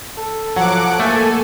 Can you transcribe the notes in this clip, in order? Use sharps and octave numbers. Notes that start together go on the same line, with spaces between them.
A4
F3 F#3 F#5 D6
A3 A#3 A4 G#5